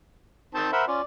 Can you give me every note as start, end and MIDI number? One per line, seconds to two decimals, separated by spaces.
0.55 0.68 51
0.55 0.68 60
0.55 0.68 81
0.55 0.72 91
0.72 0.85 70
0.72 0.84 72
0.72 0.84 76
0.72 0.85 78
0.72 0.85 83
0.88 1.01 61
0.88 1.01 65
0.88 1.03 74